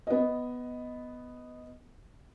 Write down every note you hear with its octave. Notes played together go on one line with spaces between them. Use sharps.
B3 D#5